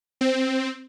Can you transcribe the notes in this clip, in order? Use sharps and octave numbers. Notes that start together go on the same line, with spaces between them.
C4